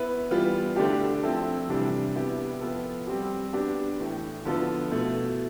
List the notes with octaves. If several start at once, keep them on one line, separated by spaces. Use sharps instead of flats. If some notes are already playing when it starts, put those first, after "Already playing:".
Already playing: B3 E4 B4
E3 G3 B3 F4
D3 A3 D4 G4
F3 C4 E4 A4
C3 E3 G3 D4
B3 E4 G4
F3 B3 F4 A4
G3 C4 G4
B3 D4 G4
A2 E3 A3
D3 F3 B3 F4 A4
B2 A3 E4